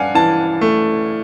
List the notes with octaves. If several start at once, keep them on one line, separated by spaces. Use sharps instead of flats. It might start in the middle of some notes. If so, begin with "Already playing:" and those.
Already playing: G2 D4 F5 F#5 G#5
E3 A5
A3